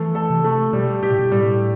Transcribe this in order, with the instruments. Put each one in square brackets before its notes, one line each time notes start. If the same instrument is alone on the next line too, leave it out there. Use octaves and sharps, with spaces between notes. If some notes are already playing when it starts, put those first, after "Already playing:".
Already playing: [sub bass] E3 [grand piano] A3 A4
[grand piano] A4
[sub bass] C3
[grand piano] A3
[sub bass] B2 [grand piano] G3
[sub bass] B2 [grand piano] G4
[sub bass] A2
B2
[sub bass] A2 [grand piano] G3